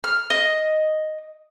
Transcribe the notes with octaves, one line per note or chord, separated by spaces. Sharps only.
F6
D#5